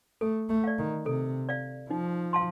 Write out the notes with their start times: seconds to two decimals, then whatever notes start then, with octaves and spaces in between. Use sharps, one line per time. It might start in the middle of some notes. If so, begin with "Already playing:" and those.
0.21 A3 A4
0.49 A3
0.64 D5 F5
0.79 D#3
1.06 C3 A4
1.49 D5 F5
1.90 F3 D#4
2.33 F5 A5 C6